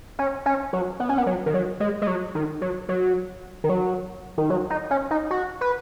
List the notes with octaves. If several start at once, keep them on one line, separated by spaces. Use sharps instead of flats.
C#4
C#4
F#3
B3
C#4
B3
F#3
D#3
F#3
G#3
G#3
F#3
D#3
F#3
F#3
D#3
F#3
D#3
F#3
D#4
C#4
D#4
F#4
B4